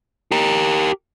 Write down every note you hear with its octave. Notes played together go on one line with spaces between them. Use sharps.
G4 A#4